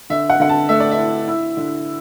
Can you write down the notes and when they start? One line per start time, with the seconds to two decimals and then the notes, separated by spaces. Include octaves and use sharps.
0.10 D3 E5
0.30 F#5
0.40 D3 F#5
0.49 A5
0.69 A3 E5
0.80 D5
0.91 E5
0.98 E4
1.28 E4
1.57 D3